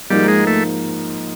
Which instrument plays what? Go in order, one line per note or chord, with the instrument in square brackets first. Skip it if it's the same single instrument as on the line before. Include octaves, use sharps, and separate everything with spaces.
[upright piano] G#2 F3 A#3 D#4 [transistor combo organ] G3
[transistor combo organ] G#3
A3